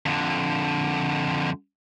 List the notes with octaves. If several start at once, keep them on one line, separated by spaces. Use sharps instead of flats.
F2 D3